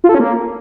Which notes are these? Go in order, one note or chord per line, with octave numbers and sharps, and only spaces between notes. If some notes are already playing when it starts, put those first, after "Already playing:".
F4
A4
C#4
A#3